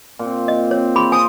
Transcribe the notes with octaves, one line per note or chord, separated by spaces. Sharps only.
A#2 C4
D#5
C4 C#5
G#4 B5 C6
C5 G#5 D#6